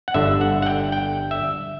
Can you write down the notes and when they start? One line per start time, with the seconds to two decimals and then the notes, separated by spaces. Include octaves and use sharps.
0.08 F#5
0.14 G1 G2 D3 E5
0.41 F#5
0.62 F#5
0.66 G5
0.92 G5
1.31 E5